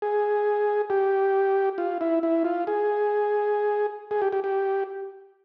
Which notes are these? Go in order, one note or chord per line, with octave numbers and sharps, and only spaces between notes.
G#4
G4
F4
E4
E4
F4
G#4
G#4
G4
G4
G4